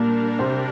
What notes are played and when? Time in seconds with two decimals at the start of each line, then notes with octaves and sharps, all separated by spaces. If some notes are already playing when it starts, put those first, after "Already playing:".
Already playing: A#2 G3 A#3 D4 A#4
0.39 C3 C4